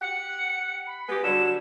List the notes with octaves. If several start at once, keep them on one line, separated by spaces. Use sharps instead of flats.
G4 F#5 C#7
B5
G#3 B3 G4
D3 F#3 G3 E7